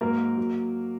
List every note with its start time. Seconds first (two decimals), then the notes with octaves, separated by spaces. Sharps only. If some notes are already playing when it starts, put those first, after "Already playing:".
0.01 G#2 F#3 A#3 A#4
0.37 F#3